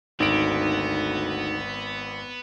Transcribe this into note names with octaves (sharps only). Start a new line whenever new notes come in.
G#1 D2 B3 D#4 D7